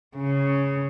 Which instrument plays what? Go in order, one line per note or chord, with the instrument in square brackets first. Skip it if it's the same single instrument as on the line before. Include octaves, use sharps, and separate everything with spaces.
[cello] C#3